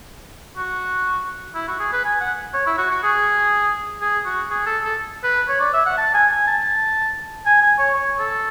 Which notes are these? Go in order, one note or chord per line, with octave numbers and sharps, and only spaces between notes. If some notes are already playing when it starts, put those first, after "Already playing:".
F#4
E4
F#4
G#4
B4
G#5
F#5
C#5
E4
F#4
F#4
G#4
G#4
F#4
G#4
A4
A4
B4
C#5
D5
E5
F#5
A5
G#5
G#5
A5
G#5
G#5
C#5
C#5
A4